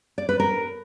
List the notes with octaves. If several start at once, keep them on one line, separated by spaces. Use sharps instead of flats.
D5
B4
A#4